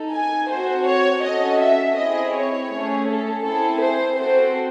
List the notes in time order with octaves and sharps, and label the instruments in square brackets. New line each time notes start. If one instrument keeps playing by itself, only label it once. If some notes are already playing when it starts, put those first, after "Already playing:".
Already playing: [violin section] D#4 A4
G#5
C4 F#4 A4 C5
C#5
C#4 F#4 A4 D#5
E5
C4 E4 G#4 D#5
C#5
A3 C#4 G#4
A4
C4 E4 G#4 A4
C5
C4 F#4 A4 C5